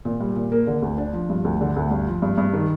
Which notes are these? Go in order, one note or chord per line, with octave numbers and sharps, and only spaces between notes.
A#2
G3
A#2
A#3
D3
D2
D4
F3
G2
D2
D3
D2
G2
F3
G2
G2
D#3